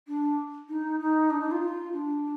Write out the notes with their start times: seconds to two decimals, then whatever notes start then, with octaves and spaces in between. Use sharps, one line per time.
0.07 D4
0.68 D#4
0.99 D#4
1.30 D4
1.40 D#4
1.51 F4
1.61 F4
1.92 D4